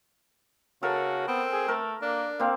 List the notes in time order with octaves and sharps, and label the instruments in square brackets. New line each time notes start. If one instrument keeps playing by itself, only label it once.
[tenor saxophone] C#3 [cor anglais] F#4 [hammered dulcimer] A4 A#4
[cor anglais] B3 [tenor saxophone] C4
[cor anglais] G#4
[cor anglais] A3 [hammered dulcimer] A#4
[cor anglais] A#3 [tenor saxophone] D4
[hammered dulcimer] A#3 C4 [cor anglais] F5